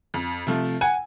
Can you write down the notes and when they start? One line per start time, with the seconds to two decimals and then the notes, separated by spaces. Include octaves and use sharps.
0.14 F2
0.47 C3 F3 A3
0.81 F#5 G#5